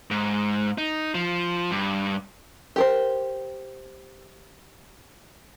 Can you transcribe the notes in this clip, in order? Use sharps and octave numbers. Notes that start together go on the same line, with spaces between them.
G#2
D#4
F3
G2
G4 A#4 C5